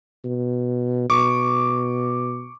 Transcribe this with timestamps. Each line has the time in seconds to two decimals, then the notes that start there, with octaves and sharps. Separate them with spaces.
0.25 B2
1.10 B2 C#6 D6